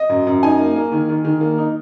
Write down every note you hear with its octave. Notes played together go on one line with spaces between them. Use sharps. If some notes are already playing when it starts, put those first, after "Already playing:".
Already playing: D#5
F#2
F#2
D#4 G#5
A#3
A#3
D#3
D#3
D#3
A#3
D#4